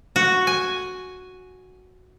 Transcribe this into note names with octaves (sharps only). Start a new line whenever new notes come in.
F#4
G#5